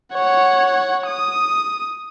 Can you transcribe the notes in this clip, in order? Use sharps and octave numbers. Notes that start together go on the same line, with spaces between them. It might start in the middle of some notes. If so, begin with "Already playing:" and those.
C#5 F#5
D#6